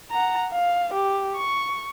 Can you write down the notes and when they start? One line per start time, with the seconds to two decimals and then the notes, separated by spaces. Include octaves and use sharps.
0.11 F#5 A#5
0.52 F5
0.93 G4
1.36 C#6